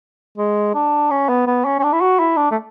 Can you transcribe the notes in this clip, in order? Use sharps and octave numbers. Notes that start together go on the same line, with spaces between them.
G#3
D4
C#4
B3
B3
C#4
C#4
D4
E4
F#4
E4
D4
A3